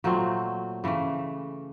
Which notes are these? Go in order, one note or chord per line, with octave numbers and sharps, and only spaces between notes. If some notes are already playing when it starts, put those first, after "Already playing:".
A#2 F#3 A3 C4
C#3 E3 A3